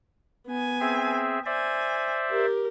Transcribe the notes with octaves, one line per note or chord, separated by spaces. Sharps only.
B3 G#5
C4 G#4 E5
C5 D5 E5 G#5
G4 A#4